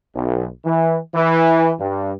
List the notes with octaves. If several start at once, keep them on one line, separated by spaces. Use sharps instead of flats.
B1
E3
E3
G2